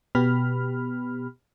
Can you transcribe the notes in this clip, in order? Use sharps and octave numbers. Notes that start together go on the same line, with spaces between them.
B2 B3 G4 B5 F6